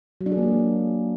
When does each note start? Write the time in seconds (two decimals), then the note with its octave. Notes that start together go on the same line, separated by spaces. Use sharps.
0.21 F#3
0.26 D4
0.32 G#4
0.37 A#3
0.43 G#3